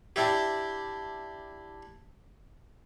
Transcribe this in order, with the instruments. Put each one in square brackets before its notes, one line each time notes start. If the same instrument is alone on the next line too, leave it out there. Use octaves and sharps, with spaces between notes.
[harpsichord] D4 E4 G4